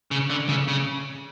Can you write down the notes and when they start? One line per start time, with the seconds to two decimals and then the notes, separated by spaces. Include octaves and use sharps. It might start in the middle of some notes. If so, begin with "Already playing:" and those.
0.11 C#3
0.30 D3
0.49 C#3
0.68 C#3